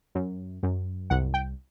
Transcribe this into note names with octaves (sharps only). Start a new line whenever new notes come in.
F#2
F#2
C2 F#5
G5